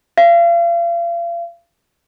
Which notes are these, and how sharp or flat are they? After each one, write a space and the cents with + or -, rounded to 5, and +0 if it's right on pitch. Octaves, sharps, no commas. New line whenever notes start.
F5 -35